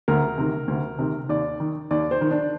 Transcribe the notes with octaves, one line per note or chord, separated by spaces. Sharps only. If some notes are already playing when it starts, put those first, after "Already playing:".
D2 A#4
C3 D#3
D2
C3 D#3
D#2 D5
D#3
D#2 D5
C5
D#3
D4